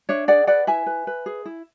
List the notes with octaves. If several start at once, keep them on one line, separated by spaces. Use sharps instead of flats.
D4 C#5 E5
G#4 D5 F#5
B4 D5 F#5
E4 E5 G#5
B4
B4
G#4
E4